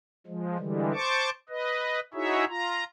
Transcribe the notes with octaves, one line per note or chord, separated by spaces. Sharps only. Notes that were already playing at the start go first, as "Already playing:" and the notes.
F3 G#3
D3 E3 G3 G#3
C5 A5 C#6 D6
B4 D#5
D#4 E4 F#4 G#4 C#5 E5
F4 A#5